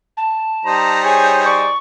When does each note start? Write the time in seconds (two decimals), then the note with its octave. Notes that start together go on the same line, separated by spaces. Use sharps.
0.17 A5
0.65 G3 D#4 C5 A#5
1.03 G#4 C#5
1.45 D5 C#6